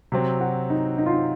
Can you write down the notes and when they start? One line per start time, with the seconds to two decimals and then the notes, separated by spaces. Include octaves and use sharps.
0.12 C3 F#3 C4
0.40 F#4
0.70 D#4
0.98 D#4
1.06 F4
1.13 D#4